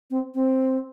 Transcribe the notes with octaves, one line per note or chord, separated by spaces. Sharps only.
C4
C4